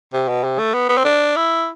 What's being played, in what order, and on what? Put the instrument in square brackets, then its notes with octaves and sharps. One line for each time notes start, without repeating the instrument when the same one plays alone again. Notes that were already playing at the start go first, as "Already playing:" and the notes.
[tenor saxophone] C3
B2
C3
A3
B3
B3
C4
D4
E4